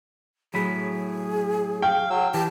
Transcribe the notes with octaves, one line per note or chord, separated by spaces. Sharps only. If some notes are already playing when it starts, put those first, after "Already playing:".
A2 F#3 G#4 B5
F5 G5
F#3 E6
E3 G4 A5